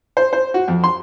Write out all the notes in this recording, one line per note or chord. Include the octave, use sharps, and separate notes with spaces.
C5
C5
F#4
F2
C6